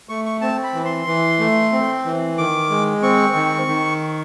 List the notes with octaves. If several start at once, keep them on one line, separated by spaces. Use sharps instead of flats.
A3 C#6
C#6
C4 A5
B5
E3
C6
E3
A3
C4
E3
D#3 D6
G#3
C4 C#6
D#3
D#3